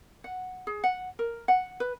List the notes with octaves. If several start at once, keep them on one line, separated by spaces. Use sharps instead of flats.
F#5
G#4
F#5
A#4
F#5
B4